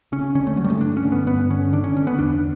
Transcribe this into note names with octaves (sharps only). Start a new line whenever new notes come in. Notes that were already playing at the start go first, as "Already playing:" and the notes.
C#3 C#4
D3 C#4
A3
G2 F#3
G3
A3
G2 D4
C#4
D3
B3
G2 B3
D3 C#4
D3 D4
C#4
D3 C#4
B3
E2 D4